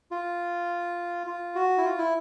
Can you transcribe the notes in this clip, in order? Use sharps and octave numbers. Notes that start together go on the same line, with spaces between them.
F4
F4
F#4
E4
F4
E4